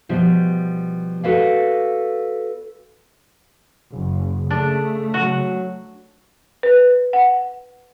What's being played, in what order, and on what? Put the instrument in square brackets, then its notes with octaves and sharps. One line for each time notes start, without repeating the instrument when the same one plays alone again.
[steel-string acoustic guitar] B2 F3 G3
F#4 A4 B4 D5 F5
[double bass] F#1 [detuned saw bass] C#3
[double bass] A3 [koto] D4 [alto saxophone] G#4
[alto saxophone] F#3 [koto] F#4
[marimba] B4
F#5